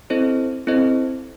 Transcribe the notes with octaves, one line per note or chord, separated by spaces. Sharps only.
C4 E4 A4 C5 D#5
C4 E4 A4 C5 D#5